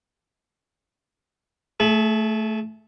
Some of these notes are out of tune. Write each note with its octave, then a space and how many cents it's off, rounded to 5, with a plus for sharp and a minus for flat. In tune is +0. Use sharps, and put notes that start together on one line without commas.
A3 +0 G#4 +40